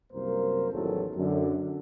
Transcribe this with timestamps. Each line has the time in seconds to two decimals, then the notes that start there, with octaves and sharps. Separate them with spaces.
0.13 C2 F#2 A#3 A#4 C5
0.72 A1 E2 D#3 F#3 A4
1.16 F#2 D3